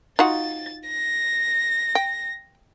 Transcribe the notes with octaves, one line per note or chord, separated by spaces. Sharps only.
D#4 F4 F#4 A6
A#6
G5